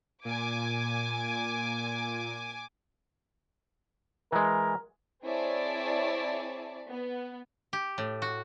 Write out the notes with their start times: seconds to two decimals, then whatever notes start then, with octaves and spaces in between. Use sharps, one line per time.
0.25 A#2 G#5 D6
4.32 E3 G#3 A#4
5.25 C4 E4 G#4 C#5 D5 A5
6.88 B3
7.73 G4
7.98 A2
8.22 F#4